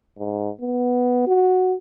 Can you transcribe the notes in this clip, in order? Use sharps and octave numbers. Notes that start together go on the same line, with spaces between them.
G#2
B3
F#4